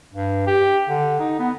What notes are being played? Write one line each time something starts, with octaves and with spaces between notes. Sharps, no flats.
G2
G4
D3
D#4
B3